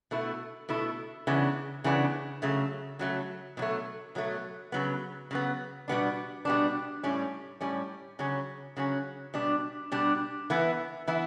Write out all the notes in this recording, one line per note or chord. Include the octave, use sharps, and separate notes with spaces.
B2 A3 E4
B2 A3 E4
C#3 E3 B3 D4
C#3 E3 B3 D4
C#3 F#3 A3
C#3 F#3 A3
B2 F#3 A3
B2 F#3 A3
C#3 F#3 B3
C#3 F#3 B3
B2 G3 B3 D4
B2 G3 B3 D4
A2 G3 C#4
A2 G3 C#4
C#3 F#3 C#4
C#3 F#3 C#4
B2 G3 D4
B2 G3 D4
E3 B3 E4
E3 B3 E4